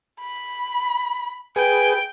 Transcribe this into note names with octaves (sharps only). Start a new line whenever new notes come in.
B5
G#4 B4 G5 G#5